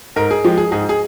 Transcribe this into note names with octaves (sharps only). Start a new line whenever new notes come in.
G#2 A#4
G#4
F3 G#3 G4
G#4
G#2 G#4
G#4